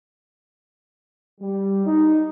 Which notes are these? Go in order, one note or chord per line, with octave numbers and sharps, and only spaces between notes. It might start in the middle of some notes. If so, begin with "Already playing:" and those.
G3
D#4